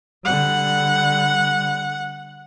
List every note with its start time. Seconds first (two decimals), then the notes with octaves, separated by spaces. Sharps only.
0.25 D3 G3 F#5